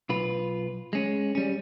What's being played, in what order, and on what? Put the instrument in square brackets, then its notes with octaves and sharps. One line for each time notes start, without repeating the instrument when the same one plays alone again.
[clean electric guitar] B1 F4 B4
G#3 C#4
G3 C#4